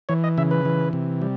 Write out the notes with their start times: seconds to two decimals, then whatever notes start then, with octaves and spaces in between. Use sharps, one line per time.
0.09 E3 C#5
0.24 D#5
0.38 C#3 E5
0.51 B4
0.65 E3
0.93 C3
1.22 G3